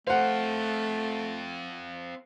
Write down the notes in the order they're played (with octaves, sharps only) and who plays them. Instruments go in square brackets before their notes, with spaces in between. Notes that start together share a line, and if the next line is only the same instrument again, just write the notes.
[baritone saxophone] A3 [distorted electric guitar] C4 F5 [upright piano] C5 F#5